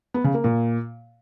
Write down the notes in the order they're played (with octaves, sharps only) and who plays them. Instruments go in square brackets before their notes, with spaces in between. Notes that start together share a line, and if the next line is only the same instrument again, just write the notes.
[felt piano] B3
C#3
A#3
A#2